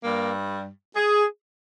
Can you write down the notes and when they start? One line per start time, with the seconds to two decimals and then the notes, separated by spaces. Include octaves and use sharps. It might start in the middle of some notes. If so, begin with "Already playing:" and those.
0.02 G2 G3 A#3
0.95 G#4